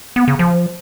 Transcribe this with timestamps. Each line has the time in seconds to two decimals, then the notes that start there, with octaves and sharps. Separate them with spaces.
0.16 B3
0.28 C#3
0.39 F3